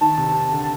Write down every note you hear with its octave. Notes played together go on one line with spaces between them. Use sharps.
D#3 A5
C3
D3